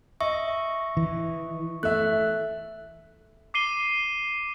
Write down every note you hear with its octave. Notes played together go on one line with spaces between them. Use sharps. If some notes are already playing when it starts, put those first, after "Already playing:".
D#5 E5 C#6
E3
A3 E5 F#6
D6 C7 D#7 G7